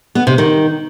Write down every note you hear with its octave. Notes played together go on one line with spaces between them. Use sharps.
B3
C3
D#3